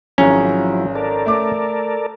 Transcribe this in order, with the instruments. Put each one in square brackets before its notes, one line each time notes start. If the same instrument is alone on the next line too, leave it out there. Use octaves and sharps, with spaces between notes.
[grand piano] G#1 G#4 A#5 [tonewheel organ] F3 F#3 E4 [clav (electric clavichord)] C#4
[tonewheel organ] A4 A#4 D5
[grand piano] A3 D6